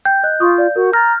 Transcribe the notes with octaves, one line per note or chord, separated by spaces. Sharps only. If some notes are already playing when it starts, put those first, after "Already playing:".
G5 G6
D#5 F#6
F4 C6 C#6 D#6
D5 F5
F#4 A#4
A#5 F6 A6 A#6